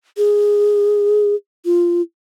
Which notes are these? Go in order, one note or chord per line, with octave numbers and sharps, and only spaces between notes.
G#4
F4